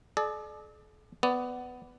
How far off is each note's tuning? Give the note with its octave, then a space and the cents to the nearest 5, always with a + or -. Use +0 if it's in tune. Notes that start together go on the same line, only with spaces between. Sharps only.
A4 -45 D5 +30
B3 +10 D5 +0